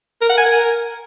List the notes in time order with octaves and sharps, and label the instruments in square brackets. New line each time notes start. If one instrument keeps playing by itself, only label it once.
[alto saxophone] A#4
F#5
G#5
A#4